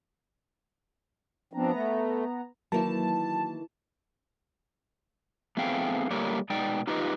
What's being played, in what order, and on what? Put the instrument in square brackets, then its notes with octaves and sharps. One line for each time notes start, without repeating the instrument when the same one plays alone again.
[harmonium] F3 C4 D4 [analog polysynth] B3 A#5
[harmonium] A3
[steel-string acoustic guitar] D#3 E3 [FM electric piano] F#3 A#3 E4 [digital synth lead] A5
[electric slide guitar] A3 B3 C4 G#4 F5 G5
G3 A3 A#3 C#5 D5
B2 G#3 D#4 D5 G5
D#4 F4 G4 B4 D#5